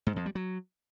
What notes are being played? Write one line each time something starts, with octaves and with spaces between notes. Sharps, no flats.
G#2
F2
G3
F#3